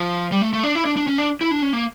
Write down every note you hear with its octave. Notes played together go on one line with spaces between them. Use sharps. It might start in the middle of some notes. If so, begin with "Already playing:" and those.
Already playing: F3
G3
A3
A3
D4
E4
D4
D4
C#4
D4
E4
D4
C#4
A#3